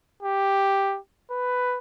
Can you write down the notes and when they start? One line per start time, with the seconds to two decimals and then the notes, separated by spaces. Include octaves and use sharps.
0.23 G4
1.31 B4